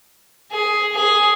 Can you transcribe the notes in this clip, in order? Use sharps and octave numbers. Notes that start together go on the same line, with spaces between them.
G#4
G#4